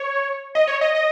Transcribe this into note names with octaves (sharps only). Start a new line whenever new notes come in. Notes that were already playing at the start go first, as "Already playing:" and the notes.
Already playing: C#5
D#5
C#5
D#5
D#5